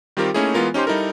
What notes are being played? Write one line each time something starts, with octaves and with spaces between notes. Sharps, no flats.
D#3 G3 C4 F4 G4 A#4
A3 A#3 C#4 D#4 E4 G#4
E3 G#3 B3 F4 A#4
C#4 D#4 G4 C5 C6
G3 D#4 E4 A4 A#4